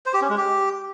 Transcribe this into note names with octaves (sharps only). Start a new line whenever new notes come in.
C5
G4
C#4
G#3
G4